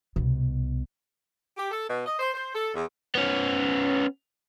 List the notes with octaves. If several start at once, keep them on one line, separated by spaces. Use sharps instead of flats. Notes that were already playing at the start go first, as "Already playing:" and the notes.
C2 B2
G4
A4
B2
D#5
C5
C5
A4
E2
B3 C#4